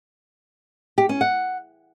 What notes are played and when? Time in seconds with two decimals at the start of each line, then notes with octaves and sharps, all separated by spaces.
0.98 G4
1.09 C#4
1.21 F#5